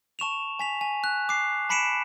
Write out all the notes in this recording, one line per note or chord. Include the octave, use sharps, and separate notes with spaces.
A5 C#6 E7 F7
G#5 B6 F7
G#5
F#6
D6 C7
A5 B5 B6 C#7 D7 E7